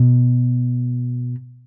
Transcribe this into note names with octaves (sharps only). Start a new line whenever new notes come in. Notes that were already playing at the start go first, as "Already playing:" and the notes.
Already playing: B2